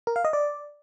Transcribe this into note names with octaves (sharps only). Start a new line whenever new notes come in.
A#4
F5
D#5
D5